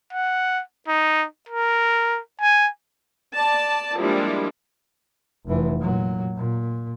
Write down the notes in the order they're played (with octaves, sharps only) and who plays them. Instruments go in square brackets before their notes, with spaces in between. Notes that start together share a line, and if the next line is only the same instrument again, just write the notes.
[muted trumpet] F#5
D#4
A#4
G#5
[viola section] D5 A5
F3 G3 G#3 A#3 D4 E4
[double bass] F1 E3
A#2 F#3
A#2